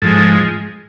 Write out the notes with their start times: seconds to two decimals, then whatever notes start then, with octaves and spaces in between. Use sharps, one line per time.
0.02 G#2 F3 G#3 A4